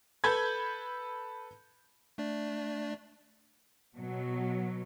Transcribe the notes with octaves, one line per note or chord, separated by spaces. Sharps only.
A4 B4 B5 G6 G#6
A3 D4 D5
B2 F#3